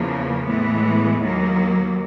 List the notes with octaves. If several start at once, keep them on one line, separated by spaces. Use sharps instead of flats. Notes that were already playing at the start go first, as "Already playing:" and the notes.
Already playing: E2 C#3 F3 A#3
A2 E3 G#3 B3
D#2 D#3 F#3 A#3